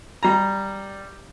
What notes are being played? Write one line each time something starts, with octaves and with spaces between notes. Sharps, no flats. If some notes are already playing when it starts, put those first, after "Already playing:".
G3 A#5